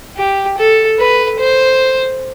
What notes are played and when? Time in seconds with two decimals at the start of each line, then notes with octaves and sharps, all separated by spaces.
0.17 G4
0.58 A4
0.99 B4
1.40 C5